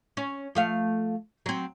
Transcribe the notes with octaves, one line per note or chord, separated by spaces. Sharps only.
C#4
F3 A3 F5
F#3 C4